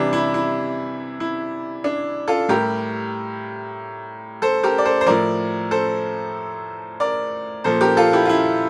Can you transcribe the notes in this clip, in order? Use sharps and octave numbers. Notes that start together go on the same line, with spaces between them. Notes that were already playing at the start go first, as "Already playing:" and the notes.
Already playing: C3 E3 G3 D4
E4
E4
E4
D4
F4 A4
A2 G3 G4 A#4
A4 C5
G4 A#4
D5
A4 C5
C5
A2 F3 A#4 D5
A4 C5
A#4 D5
A#2 F3 A4 C5
G4 A#4
F4 A4
E4 G4
F4
E4